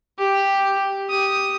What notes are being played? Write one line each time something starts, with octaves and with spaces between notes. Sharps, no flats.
G4
G4 D#6